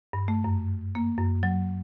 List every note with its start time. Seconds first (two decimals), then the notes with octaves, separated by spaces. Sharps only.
0.13 G2
0.28 A3
0.44 F#2
0.95 A#3
1.18 F#2
1.43 F#3